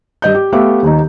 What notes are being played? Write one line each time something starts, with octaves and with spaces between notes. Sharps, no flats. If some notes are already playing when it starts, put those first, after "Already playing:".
G2 D#5 G6
G4
A3 B3 G4 E5 F5
D#1 D#2 D#4